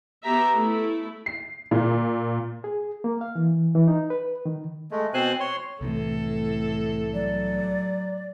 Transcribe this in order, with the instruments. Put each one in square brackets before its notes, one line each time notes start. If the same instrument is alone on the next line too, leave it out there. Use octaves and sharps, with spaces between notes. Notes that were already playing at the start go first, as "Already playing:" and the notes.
[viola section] B3 G4 E5 A#5
A3 E4
[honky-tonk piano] C7
A#2
[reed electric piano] G#4
A#3
F5
E3
E3
D#4
B4
D#3
[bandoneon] G#3 A3
B2 C4 C5 G#5 F#6
C#5 C6
[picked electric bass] C2 C3 E3 [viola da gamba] A2 A4
[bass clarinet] F#3 [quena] D5